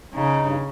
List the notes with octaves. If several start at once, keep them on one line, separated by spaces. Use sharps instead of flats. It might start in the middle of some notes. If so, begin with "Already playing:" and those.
C#3 D#4
G2